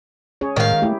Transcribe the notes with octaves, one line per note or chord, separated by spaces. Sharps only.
C#4 G#4 C#5
A2 D#3 G#3 A#4 F5
A3 E4 G4